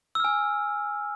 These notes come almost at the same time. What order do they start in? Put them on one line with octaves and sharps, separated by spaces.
E6 F6 G#5